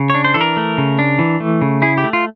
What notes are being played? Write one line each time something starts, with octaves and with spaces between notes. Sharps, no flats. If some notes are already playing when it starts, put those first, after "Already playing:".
Already playing: C#3
D4 C#5
C5
E3 A4
A#4
A3
C#3
D4
E3
A3
C#3
E4 G#4
G4
A3
F4